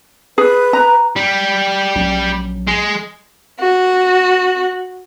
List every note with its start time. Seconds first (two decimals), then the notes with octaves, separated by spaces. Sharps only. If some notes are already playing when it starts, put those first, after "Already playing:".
0.38 G#4 B4
0.73 A#5
1.16 G3
1.95 A#1 F#3 C#4
2.68 G#3
3.60 F#4